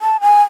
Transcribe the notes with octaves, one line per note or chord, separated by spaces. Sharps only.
A5
G#5